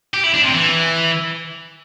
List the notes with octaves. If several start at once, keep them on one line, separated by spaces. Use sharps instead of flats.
G4
E4
D4
C3
E3